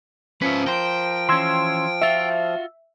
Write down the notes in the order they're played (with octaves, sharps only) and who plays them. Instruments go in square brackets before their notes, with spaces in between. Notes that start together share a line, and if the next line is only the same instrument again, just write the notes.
[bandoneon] F3 [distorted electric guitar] C#4 E5 [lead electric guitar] B4
[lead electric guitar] A#4 C5 [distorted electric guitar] G5
[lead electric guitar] E3 C#4 [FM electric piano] C6 E6 G#6
[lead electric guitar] F4 F#4 [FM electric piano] E5